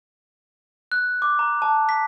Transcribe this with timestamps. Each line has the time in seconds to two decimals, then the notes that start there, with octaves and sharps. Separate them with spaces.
0.92 F#6
1.22 D6
1.39 A#5
1.62 A5
1.89 B6